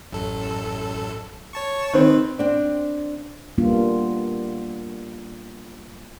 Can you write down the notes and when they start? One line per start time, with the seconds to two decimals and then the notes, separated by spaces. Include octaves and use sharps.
0.12 A1 F#2 A4
1.53 C#5 A5 C#6
1.94 D#3 C4 B4
2.39 C4 D4
3.58 G3 A#3 B3 D4 F4